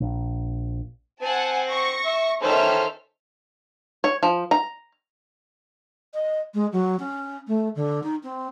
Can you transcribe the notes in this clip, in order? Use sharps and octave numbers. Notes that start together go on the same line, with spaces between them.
A#1
C4 F#5 G#5 A5
C#6 A#6
E5
D#3 C#4 A4 C5 E5 F6
C#5
F3
A#5
D#5
G#3
F#3
C#4
A3
D3
D#4
C4